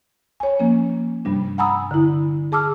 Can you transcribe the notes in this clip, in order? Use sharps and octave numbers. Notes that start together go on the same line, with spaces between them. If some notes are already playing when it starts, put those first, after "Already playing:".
C#5 G#5
F3 A#3 C#4
G2 C3 G3 D4
F#5 G#5 A#5 B5 D#6 E6
D3 E4
G#4 A5 D6 E6 F6